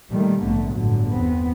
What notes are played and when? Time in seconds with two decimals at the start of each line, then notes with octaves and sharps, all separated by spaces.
0.11 A#2 D#3 G3 A3
0.42 A#1 G#2 D3 A3 B3
0.73 G1 A2 D3 F#3
1.10 E2 B3 C4